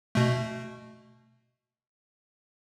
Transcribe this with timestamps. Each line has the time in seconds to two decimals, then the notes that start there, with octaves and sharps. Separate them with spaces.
0.15 B2 A3